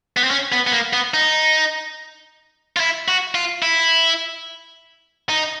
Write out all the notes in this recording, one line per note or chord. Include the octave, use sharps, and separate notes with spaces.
B3
C4
C#4
B3
B3
A#3
B3
D#4
F4
E4
F#4
F4
E4
D#4